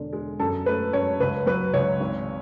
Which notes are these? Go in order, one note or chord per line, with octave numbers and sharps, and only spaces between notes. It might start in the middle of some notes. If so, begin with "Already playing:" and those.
Already playing: E1 D3
G#3
F#2 A4
A3 B4
F#2 C#5
C#2 B4
F#3 B4
C#2 C#5
G#1